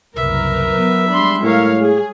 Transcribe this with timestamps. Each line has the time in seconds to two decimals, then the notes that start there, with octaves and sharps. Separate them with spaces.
0.16 F#1 C2 A#4 B4 E5
0.73 F#3 B3
1.10 G3 G#3 D4 B5 C6
1.44 A2 A#4 C#5 F5
1.79 G#4